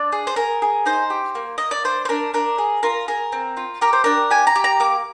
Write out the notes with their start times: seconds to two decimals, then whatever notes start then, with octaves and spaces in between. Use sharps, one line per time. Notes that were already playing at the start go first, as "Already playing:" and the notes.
Already playing: D4 D5
0.12 G#4
0.27 C5
0.36 G#4 A#4
0.62 G#4
0.86 D#4 C5
1.10 G4
1.35 A#3
1.58 A#3 D#5
1.71 D5
1.84 D4 C5
2.05 C5
2.09 D4 A#4
2.34 D4 A#4
2.58 G#4
2.83 F4 A#4
3.08 G#4 A#4
3.32 C4
3.57 F4
3.81 G4 A#4
3.93 C5
4.04 D4 A#4
4.30 G4 G#5
4.47 A#5
4.55 G4
4.64 A#5
4.80 A#3 D6